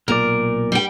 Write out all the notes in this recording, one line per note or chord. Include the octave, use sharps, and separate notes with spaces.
B1 A#2 A#4 D5
G3 G5